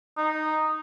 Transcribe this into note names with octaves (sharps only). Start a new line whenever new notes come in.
D#4